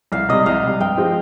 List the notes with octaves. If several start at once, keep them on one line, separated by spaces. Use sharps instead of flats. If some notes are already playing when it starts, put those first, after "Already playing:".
C2 F5
C3 G3 D#5
C2 F5
C3 G3
G2 G5
F3 G#3 C4 G4